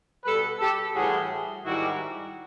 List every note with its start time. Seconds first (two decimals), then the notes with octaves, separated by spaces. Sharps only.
0.24 B2 G3 A4 B4
0.59 G4 A4
0.94 A2 E3 G3 F#4 G#4
1.64 G#2 D#3 G3 E4 F#4